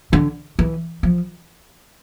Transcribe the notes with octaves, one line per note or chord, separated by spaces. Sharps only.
D3
E3
F3